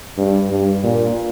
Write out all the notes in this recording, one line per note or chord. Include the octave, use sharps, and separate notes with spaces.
G2
G2
A#2